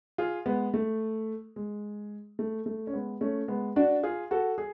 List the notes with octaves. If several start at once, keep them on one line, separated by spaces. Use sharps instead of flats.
F4 G#4
G#3 B3
A3
G#3
A3
A3
C#4
G#3 B3
A3 C#4
G#3 B3
D4 F#4
F4 G#4
F#4 A4
G#4